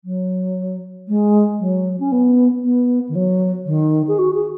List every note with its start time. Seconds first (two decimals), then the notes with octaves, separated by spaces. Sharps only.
0.04 F#3
1.08 G#3
1.59 F#3
2.00 C#4
2.11 B3
2.63 B3
3.08 D#3
3.15 F#3
3.66 D#3
4.08 G#4
4.18 F#4
4.34 G#4